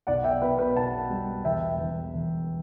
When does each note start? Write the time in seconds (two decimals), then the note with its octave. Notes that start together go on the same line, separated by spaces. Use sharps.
0.07 B1 D5 F#5
0.24 E5 G5
0.42 B2 B4
0.59 B4
0.76 B1 F#5 A5
1.10 G3
1.44 E1 E5 G5
1.79 E2
2.14 E1